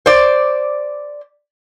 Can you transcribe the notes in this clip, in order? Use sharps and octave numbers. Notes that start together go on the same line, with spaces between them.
C5 D5